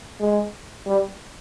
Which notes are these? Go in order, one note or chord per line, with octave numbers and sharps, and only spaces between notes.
G#3
G3